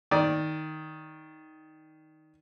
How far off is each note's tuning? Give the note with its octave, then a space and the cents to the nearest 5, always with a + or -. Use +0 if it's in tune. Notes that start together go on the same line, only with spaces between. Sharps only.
D#3 +5 D5 +0